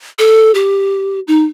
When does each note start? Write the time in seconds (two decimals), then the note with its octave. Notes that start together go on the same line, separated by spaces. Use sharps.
0.19 A4
0.54 G4
1.27 D#4